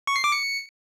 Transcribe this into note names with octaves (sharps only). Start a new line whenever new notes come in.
C#6
C7
D6
C#7